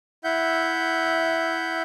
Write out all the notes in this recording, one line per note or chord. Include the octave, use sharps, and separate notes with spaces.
E4 E5 F#5 G6